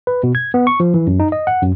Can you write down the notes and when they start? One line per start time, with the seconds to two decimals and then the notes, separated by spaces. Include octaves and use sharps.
0.07 B4
0.23 B2
0.35 G#6
0.54 B3
0.67 C#6
0.80 F3
0.94 E3
1.07 F#2
1.20 D#4
1.32 D#5
1.47 F#5
1.62 F#2